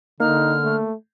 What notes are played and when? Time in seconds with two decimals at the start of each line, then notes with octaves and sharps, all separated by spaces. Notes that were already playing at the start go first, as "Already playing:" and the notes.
0.20 D3 A#3 D#4 F6
0.64 A3